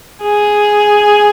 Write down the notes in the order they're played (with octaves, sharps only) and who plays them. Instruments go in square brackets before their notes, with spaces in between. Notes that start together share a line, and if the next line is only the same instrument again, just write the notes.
[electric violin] G#4